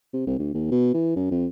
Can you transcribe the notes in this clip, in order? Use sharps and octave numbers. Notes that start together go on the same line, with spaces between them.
C3
C2
D2
D#2
B2
E3
F#2
F2